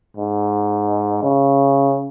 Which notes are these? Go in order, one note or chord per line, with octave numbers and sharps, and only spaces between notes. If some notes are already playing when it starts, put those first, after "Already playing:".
G#2
C#3